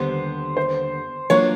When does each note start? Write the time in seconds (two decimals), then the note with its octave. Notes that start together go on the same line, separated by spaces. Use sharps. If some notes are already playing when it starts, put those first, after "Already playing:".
Already playing: D#2 D3 G3 B3 C5
0.57 C5
1.30 F#3 A#3 D4 F4 C#5